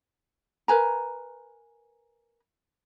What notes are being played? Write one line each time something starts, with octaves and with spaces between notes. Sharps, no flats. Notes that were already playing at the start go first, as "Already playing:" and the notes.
A#4 B4 G#5 A#5